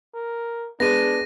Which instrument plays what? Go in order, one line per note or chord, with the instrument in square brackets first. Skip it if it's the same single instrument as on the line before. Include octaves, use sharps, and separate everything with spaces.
[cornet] A#4
[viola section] G#3 [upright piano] B3 [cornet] D4 [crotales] A#6 D#7